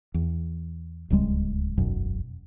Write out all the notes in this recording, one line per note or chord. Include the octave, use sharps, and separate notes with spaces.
E2
D1 C#2 G3 G#3
E1 B1 F#2